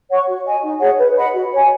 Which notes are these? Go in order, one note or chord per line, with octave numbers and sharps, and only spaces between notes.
C#5 F#5 C#6
F#4
D#5 G#5
D#4
G#4 C#5 F#5
B4
D#5 F#5 B5
F#4
C#5 G#5